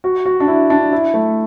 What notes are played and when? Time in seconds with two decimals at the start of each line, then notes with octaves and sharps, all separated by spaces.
0.04 F#4
0.25 F#4
0.40 D4
0.48 E4
0.70 D4
0.92 E4
1.14 A3